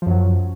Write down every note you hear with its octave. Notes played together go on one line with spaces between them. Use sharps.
F#2 F3 F#3